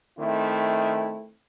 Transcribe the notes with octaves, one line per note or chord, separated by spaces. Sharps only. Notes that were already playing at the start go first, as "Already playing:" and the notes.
D#3 A3 C4 E4